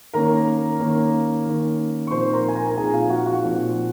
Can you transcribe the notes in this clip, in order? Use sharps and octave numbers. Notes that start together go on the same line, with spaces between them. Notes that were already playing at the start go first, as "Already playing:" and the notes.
D#3 A#3 C#4 A#4 A#5
D#3 A#3 C#4
D#3 A#3 C#4
C#6
A#2 F3 C4 D#4 C5 C6
A#4 A#5
G#5
A#4 A#5
A#5
A#2 F3 C4 D#4 G#4 G#5
F4 F5
F#4 F#5
F#4 F#5
A#2 F3 C4 D#4